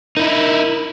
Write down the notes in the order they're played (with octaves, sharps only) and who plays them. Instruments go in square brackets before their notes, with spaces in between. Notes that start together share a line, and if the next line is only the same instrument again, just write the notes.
[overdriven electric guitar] D#4 E4 [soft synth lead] A#4